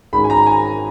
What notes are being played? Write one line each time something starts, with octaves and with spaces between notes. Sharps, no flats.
G#1 G#2 D#3 G#3 C#4 B5
G#5
A#5
G#5